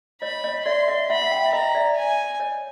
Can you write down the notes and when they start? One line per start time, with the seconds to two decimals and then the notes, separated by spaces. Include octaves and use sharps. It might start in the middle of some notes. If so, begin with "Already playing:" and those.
0.22 C#5 D#5 B5
0.44 C#5 D#5
0.66 D5 E5 C6
0.88 D#5 F5
1.09 E5 F#5 B5
1.22 F#5
1.31 F5 G5
1.46 E5
1.53 D#5 F5 A#5
1.75 D5 E5
1.97 G#5
2.40 C#5 D#5